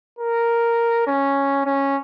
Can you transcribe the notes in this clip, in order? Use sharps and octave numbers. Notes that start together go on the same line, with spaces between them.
A#4
C#4
C#4